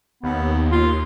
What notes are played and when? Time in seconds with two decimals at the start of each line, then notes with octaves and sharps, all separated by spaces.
0.23 D#2 B3
0.72 F4